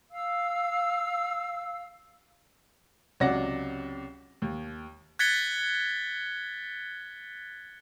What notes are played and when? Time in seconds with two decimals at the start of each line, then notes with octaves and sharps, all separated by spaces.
0.12 F5 E6
3.20 C#2 C3 F#3 D5 F#5 A#6
4.42 D#2
5.19 F#6 G#6 A6 B6 C#7 G7